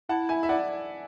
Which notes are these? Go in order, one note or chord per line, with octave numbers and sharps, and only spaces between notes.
E4 F#5 A5
E5 G#5
E5
D5 F#5